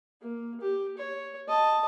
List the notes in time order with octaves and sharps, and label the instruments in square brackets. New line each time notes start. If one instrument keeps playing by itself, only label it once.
[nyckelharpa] A#3
G4
C#5
D#5 A5